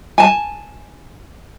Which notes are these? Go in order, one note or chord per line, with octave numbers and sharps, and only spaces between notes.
G#5 A5